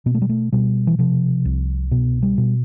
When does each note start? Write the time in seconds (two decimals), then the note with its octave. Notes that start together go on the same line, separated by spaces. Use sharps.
0.06 B2 B3
0.15 A3
0.22 G3
0.29 A3
0.52 B2 G3
0.87 E3
0.99 C3 F3
1.45 C2
1.91 B2 B3
2.22 G3
2.38 B2